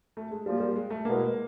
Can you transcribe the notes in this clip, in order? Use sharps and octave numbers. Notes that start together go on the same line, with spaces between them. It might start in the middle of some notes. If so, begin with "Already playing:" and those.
A3
G#3
A#2 F3 G3 A#3
G3
G#3
A3
E2 B2 G#3 A#3